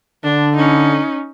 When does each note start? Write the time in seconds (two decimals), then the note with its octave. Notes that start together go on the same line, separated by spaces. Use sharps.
0.24 D3 D4
0.56 C#4 D#4